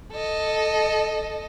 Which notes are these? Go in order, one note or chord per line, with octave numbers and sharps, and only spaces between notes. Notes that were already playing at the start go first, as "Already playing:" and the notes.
A4 D#5